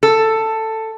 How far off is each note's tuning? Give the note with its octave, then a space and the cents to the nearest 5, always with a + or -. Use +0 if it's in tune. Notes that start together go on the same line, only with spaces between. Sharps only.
A4 +10